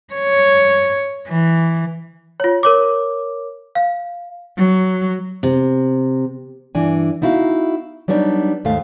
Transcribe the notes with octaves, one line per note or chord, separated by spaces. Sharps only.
C#5
E3
F4 C#5
A#4 C#5 D6
F5
F#3
C3
G2 E3 D4 G#5
B3 D#4 E4 F#4 F5
F#3 G3 B3 D4 D#4
D#2 G#2 A3 F5